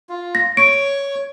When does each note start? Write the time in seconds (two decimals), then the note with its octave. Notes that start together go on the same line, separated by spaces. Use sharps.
0.09 F4
0.35 A#6
0.57 C#5 C#6 D7